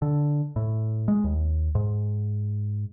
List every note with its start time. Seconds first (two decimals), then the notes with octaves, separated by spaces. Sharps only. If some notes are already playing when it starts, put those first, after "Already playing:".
0.02 D3
0.56 A2
1.08 G#3
1.24 D#2
1.75 G#2